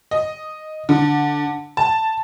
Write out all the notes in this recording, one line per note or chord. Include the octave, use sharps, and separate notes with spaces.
D#5
D3
A5